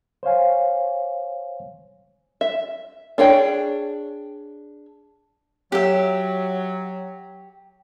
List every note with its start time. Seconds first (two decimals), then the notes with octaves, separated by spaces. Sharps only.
0.23 C5 C#5 F5 G#5
2.41 E5
3.18 D4 G#4 C#5 G5
5.72 F#3 G4 E5